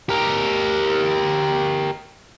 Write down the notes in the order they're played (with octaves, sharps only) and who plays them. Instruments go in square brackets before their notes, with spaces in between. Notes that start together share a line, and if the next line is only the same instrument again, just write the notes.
[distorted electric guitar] G4 A#4